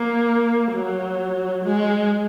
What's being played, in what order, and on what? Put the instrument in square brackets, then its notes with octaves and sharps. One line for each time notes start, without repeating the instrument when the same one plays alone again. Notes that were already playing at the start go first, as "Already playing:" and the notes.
Already playing: [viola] A#3
F#3
G#3